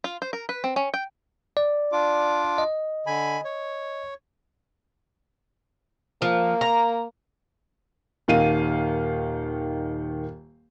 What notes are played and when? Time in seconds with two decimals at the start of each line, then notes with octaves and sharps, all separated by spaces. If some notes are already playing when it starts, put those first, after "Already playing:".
0.04 F4
0.22 C5
0.33 A#4
0.49 B4
0.64 C4
0.76 C#4
0.94 G5
1.57 D5
1.92 D4 F4 D6
2.58 D#5
3.07 D3 G#5 B5
3.45 C#5
6.22 F3 A#3
6.61 A#5
8.28 D#1 D#3 F5 D#7